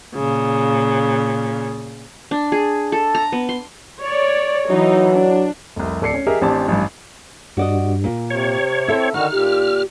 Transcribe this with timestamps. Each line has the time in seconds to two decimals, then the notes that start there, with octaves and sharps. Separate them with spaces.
0.14 A#2 C#3
2.31 D4
2.52 G#4
2.92 A4
3.15 A#5
3.32 B3
3.49 C6
4.00 C#5 D5
4.70 E3 F#3 D#4
5.13 D4
5.76 F1 C2
6.01 D1 A4 D5 C7 C#7
6.14 C#4
6.27 G4 G#4 A#4 D#5 E5
6.41 A1 C4 D4 G4 A5
6.68 A1 G2
7.57 G2 F#4 D5 D#5
8.04 A#2
8.30 C3 C#5
8.88 C4 E4 A4 E5
9.14 D3 D#3 D#4 F#4 F6
9.32 A#2 G4